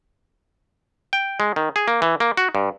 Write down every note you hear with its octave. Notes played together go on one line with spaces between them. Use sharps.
G5
G#3
D#3
G#4
A#3
E3
A#3
F#4
G2